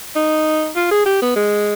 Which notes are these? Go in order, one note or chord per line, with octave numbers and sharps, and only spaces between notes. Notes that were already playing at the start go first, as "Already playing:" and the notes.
D#4
F4
G#4
G4
B3
G#3